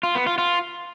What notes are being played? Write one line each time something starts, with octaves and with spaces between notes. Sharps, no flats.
F4
B3
F4
F4